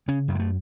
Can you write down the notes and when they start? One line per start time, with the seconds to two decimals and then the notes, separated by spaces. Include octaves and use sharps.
0.08 C#3 C#4
0.28 F#2
0.35 G#3
0.39 A3